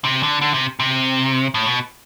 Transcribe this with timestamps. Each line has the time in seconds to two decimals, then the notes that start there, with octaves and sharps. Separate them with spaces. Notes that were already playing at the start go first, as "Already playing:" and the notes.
0.04 C3
0.23 D3
0.41 D3
0.54 C3
0.80 C3
1.54 A2
1.66 B2